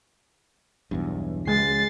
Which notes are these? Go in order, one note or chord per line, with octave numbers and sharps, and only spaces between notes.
B1 E2 G2
C#2 G#3 A6 C7